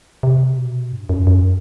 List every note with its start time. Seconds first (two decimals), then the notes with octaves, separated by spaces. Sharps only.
0.23 C3
0.58 B2
0.92 G2
1.09 F#2
1.27 F#2